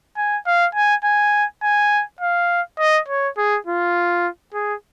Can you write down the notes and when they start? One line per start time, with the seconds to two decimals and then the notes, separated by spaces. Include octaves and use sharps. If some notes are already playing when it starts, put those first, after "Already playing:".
0.17 G#5
0.46 F5
0.75 G#5
1.04 G#5
1.63 G#5
2.21 F5
2.80 D#5
3.08 C#5
3.38 G#4
3.67 F4
4.54 G#4